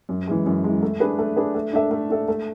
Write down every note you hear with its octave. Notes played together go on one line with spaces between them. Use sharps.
F#2
E3 G#3
F#2
E3 G#3
A3
D4 G#4 B4
A3
D4 G#4 B4
A3
D4 A4 E5
A3
D4 A4 E5
A3